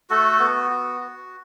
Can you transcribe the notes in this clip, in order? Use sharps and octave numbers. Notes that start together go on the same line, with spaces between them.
A3 F#4 A4
B3
F#4
F#4